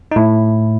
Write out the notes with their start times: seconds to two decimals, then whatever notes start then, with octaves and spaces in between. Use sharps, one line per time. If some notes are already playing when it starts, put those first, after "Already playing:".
0.11 D#4
0.16 A2 E4